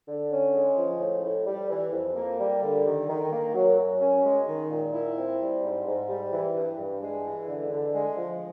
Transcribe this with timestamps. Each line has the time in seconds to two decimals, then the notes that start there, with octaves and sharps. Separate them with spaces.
0.08 D3
0.32 C#4
0.54 G#3
0.77 F3
1.00 A2
1.24 A2
1.47 G3
1.70 E3
1.93 F2
2.16 A#3
2.39 G3
2.63 D3
2.86 D#3
3.09 D#3
3.32 A#3
3.55 F#3
3.78 F#2
4.01 C#4
4.25 G#3
4.48 D#3
4.71 A#2
4.94 E4
5.18 C4
5.40 G3
5.64 G#2
5.87 G#2
6.09 G3
6.33 E3
6.56 G2
6.79 G2
7.02 G#3
7.25 E3
7.48 D3
7.71 D3
7.94 G#3
8.17 F3